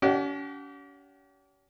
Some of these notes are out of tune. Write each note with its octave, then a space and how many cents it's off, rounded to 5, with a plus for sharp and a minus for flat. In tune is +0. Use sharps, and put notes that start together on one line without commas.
C#4 +40 G4 -40 F#5 -20